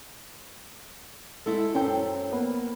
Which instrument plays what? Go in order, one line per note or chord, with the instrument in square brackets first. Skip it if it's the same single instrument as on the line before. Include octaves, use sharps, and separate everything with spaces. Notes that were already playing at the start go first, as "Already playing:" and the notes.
[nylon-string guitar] G#3 E4 [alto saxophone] A4
[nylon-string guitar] F#2 C5 [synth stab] C#4 G5
[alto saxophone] A#3 [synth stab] B3 B4